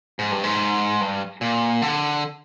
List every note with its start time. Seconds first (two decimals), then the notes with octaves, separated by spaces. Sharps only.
0.19 G#2
0.32 G2
0.44 G#2
1.01 G2
1.41 A#2
1.82 D3